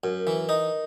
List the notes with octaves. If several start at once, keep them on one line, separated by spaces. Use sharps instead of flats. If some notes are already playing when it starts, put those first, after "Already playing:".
F#2 A#4
E3
D#4